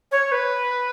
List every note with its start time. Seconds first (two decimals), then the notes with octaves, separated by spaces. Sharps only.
0.12 C#5
0.32 B4